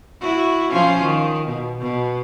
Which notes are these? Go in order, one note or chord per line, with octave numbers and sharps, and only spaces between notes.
E4 F#4
F3 C#4 F4
D#3
B2
B2